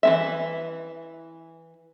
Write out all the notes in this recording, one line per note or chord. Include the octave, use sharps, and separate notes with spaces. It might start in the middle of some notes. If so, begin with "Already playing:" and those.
E3 C#4 E5